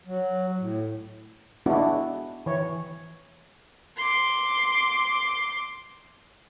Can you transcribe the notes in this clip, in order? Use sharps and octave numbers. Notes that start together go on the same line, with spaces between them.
F#3
A2
G#3 B3 D4 E4 F#4
E3 C#5
C6 D6